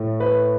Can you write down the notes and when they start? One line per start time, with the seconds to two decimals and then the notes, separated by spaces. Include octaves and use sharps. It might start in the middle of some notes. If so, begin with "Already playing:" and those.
Already playing: A2 A3
0.20 B4